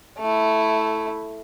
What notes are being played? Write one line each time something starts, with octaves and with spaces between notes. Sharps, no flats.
A3 E4